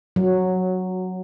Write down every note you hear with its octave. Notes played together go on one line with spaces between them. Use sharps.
F#3